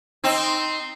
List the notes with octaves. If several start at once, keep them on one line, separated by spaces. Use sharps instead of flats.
C4 D#4